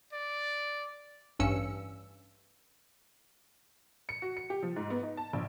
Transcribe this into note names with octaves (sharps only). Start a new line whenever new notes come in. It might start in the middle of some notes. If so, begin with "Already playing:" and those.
D5
A1 G2 C#4 E6 C#7
C#7
F#4
C#7
G4
F3
G#2
B3
D#4
A5
A#1